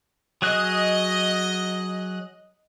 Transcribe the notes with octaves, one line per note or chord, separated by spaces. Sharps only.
F#3 G#4 D#5 F#6